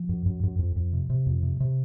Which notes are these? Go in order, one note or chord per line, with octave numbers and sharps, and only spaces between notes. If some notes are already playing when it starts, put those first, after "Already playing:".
Already playing: F3
F#2
F#2
F#2
F2
F2
C3
C3
F2
C3
C3